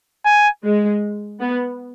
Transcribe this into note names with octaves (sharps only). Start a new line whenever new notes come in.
G#5
G#3
B3